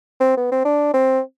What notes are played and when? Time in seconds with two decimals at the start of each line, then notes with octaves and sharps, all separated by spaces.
0.21 C4
0.37 B3
0.52 C4
0.65 D4
0.94 C4